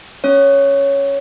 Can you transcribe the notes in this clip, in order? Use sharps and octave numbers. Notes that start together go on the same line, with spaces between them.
C#4 C#5